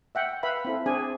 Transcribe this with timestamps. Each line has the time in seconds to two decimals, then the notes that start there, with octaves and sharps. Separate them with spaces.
0.15 E5 F#5 G5
0.43 B4 E5 F5 B5
0.65 C4 E4 A4
0.86 C4 D4 G#4 D5 G#5